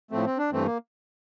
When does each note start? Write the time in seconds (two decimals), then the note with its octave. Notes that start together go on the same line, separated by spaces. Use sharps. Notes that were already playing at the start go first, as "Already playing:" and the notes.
0.11 A2 F3 A3 C4
0.26 C4
0.38 D4
0.52 G2 E3 A3 C4
0.66 A#3